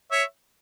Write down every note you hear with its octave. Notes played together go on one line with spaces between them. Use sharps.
C#5 E5